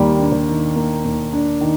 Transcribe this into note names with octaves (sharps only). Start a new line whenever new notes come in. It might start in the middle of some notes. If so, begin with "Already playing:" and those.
Already playing: D#2 G3 A#3
D4
D#3
A#3
D#2
D4
D#3